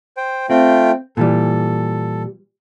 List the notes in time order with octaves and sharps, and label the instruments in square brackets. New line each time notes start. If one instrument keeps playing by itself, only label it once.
[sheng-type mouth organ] C5 G5
[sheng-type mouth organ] A3 F4 G5 [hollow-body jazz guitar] C4
[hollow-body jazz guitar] A#2 E3 G3 [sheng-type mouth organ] A4